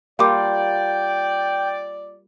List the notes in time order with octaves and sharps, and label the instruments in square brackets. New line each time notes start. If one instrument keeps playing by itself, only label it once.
[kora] G3 A#3 F4 [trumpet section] D5 [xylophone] F5 D6 [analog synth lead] G5